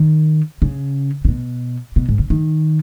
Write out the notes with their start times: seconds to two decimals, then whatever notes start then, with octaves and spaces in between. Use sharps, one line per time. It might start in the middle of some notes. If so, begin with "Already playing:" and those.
Already playing: D#3
0.62 C#3
1.25 C#3
1.28 B2
1.96 B2
2.09 G#2
2.19 C#3
2.30 D#3